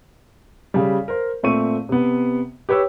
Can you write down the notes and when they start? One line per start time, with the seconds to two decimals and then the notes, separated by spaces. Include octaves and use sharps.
0.74 C#3 G3
1.08 A#4 C5
1.43 A#2 A3 C4 C#6 D#7
1.89 C3 B3
2.69 G4 B4 C#5 G5 E6